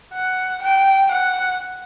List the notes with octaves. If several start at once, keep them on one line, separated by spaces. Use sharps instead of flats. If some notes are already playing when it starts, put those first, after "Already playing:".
F#5
G5
F#5